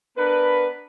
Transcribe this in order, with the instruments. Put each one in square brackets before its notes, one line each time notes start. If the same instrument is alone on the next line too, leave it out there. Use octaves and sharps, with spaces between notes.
[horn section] B3 D4 A#4 B4